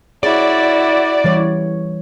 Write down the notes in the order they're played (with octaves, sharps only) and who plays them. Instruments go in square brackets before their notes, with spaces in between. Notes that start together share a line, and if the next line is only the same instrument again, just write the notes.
[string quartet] E4 F#4 [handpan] G#4 C#5 [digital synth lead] D5
[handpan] E3 G3 C#5